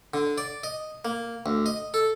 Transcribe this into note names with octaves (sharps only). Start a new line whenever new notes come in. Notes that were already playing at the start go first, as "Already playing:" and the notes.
D3
D5
D#5
A#3
D2
D#5
A4